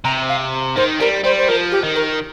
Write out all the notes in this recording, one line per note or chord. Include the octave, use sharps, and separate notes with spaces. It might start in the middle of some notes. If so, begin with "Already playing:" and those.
C3 A#5
F5
D#3 C5
G3 A#4
G3 C5
C5
F3 A#4
G4
D#3
A#4